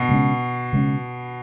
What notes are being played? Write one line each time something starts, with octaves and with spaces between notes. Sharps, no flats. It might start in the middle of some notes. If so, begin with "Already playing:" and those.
Already playing: B2
C#3 G#3 C#4
C#3 G#3 C#4